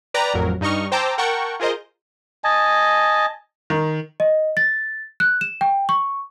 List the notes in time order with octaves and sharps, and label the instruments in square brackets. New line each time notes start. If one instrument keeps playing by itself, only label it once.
[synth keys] B4 D5 G5 A#5
A1 F2 F#3 A#4
G2 D#4 D#5 C#6 F6
C5 G5 A5 A#5 D6 E6
A#4 F#5 G5 A5 C#6
F4 G#4 A#4 C5 D#5
[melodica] D#5 G#5 A5
[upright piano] D#3
[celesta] D#5
A6
F#6
E7
G5
C#6